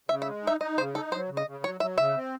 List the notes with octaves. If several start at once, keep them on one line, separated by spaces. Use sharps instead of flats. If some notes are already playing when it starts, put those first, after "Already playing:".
C#3 E5
E5
G#3
D#4 E5
D#4 D#5
C#3 C5
D#4 A4
F#3 C5
C#3
D#5
C#3
F#3 C#5
F#3 E5
C#3 E5
C4